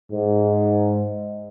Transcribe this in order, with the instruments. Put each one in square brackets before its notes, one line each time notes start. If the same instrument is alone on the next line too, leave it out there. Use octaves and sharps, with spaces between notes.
[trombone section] G#2